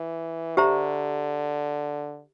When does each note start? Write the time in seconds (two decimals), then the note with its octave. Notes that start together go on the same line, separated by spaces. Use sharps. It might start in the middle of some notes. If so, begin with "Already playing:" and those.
Already playing: E3
0.57 D3 G4 C5 E5 A#5